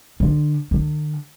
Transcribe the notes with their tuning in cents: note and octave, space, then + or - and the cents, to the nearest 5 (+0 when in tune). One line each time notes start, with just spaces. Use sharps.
D3 +30
D3 +45